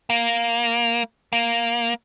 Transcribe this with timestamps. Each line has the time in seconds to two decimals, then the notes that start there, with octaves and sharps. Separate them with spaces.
0.10 A#3
1.33 A#3